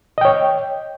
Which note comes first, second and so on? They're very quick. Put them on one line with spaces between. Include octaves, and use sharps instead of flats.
D#5 G5 C#5